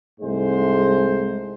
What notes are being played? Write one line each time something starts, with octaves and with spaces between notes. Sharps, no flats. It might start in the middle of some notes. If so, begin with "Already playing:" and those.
C2 G#2 G#3 A3 C5